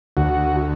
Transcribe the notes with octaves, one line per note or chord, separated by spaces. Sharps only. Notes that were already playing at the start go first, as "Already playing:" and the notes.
D2 F#4